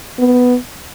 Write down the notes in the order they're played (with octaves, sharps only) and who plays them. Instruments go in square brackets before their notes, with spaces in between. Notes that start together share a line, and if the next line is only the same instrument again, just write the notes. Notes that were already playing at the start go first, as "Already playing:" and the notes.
[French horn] B3